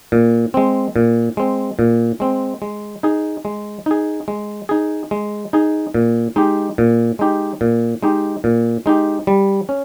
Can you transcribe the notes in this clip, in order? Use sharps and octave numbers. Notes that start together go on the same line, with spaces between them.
A#2
G#3 C4
A#2
G#3 C4
A#2
G#3 C4
G#3
D#4 G#4
G#3
D#4 G#4
G#3
D#4 G#4
G#3
D#4 G#4
A#2
G#3 D#4 G4
A#2
G#3 D#4 G4
A#2
G#3 D#4 G4
A#2
G#3 D#4 G4
G3
C#4